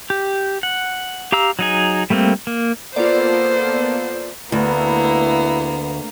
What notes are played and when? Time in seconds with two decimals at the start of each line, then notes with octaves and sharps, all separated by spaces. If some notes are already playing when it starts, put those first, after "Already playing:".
0.10 G4
0.63 F#5
1.32 G4 F5 A#5 E6
1.59 F#3 D#4 G#4
2.10 G3 A3 A#3 C4
2.47 A#3
2.96 A#3 B3 F4 A4 C5 D5
4.52 D2 A#3 B3 E4